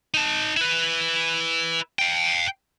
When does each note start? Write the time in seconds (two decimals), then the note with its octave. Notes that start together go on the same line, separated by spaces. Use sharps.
0.14 D#4 A5
0.57 E4 B4
1.99 F5 G5